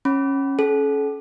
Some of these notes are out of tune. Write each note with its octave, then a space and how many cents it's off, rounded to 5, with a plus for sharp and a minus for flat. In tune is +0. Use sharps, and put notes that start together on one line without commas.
C#4 -15 F#5 +15 B5 +0
C#4 +0 A4 -40